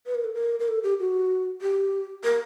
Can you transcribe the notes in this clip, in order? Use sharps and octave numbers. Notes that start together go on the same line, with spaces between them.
B4
A#4
A4
A#4
A#4
A4
G4
F#4
G4
A#4